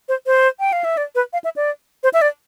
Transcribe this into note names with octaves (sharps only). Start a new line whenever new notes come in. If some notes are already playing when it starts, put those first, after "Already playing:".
C5
C5
G5
F5
E5
D5
B4
F5
E5
D5
C5
E5
D5